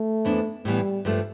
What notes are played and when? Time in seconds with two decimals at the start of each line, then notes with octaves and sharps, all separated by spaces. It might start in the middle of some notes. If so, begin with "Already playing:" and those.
Already playing: A3
0.25 F2 E3 B3 D4
0.65 A2 E3 G3 B3
1.05 G2 F3 A3